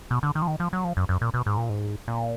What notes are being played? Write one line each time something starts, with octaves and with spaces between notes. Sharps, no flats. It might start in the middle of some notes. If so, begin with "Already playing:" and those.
B2
D3
D#3
F3
D#3
F3
F#3
F3
F#2
F#2
A#2
B2
G#2
A#2
G#2
A#2